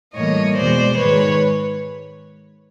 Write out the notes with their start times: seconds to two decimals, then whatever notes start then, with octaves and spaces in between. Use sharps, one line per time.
0.15 A2 E3 G3 A#3 C#5 D#5
0.56 E2 B2 G#3 C5 D5
0.98 G#2 D#3 G#3 B4 C#5